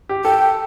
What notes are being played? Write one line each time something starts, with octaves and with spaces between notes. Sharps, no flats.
G4
A4 G5